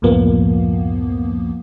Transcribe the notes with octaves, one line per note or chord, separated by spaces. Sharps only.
C#2 F#2 A2 F3 A#3 B3